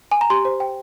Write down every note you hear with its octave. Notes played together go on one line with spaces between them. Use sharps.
G#5
A#5
G4 C6
C5
G5